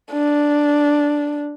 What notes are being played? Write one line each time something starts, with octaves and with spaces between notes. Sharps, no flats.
D4